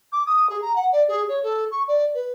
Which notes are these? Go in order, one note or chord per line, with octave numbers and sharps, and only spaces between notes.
D6
D#6
G#4
A#5
F#5
D5
G#4
C#5
A4
C#6
D5
B4